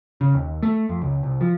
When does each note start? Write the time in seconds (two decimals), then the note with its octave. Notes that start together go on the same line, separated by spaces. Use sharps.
0.21 C#3
0.35 D#2
0.63 A3
0.89 F2
1.02 C#2
1.23 C2
1.41 F3